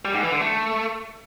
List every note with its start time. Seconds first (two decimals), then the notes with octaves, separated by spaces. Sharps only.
0.05 G3
0.14 G#2
0.23 E3
0.32 D3
0.41 A3